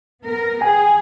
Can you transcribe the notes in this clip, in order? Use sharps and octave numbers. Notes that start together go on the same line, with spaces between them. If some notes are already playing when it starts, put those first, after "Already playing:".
B3 A#4
G#4 G5 G#5